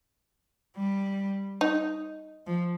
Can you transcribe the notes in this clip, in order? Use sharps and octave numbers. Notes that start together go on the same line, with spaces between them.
G3
D#4
F3